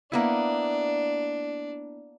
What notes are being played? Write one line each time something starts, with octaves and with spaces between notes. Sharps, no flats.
A#3 B3 D4 E4